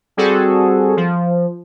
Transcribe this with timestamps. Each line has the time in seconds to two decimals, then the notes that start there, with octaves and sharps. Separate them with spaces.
0.17 G3 C4 F#4 G#4 A4
0.97 F3